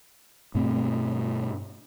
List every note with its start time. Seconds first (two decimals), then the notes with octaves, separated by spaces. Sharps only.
0.55 G2 B2 A3 C4